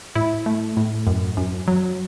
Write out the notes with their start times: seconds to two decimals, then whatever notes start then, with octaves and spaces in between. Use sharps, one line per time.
0.15 A2 E4
0.46 A3
0.77 A2
1.07 F#2
1.37 F#2
1.68 F#3